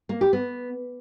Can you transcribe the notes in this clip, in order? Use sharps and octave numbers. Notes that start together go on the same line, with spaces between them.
A#3
G4
B3